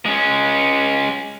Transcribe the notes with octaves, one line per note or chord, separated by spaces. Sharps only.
G#3 C#4